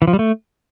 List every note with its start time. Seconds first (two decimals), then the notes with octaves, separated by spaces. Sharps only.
0.02 E3
0.07 F3
0.13 G3
0.19 A3